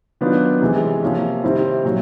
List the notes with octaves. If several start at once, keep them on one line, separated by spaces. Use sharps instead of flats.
D#3 F#3 B3 D4 F4
C3 E3 G#3
C3 F3 A#3 C#4
C3 D#3 G3 C4 E4
A#2 F#3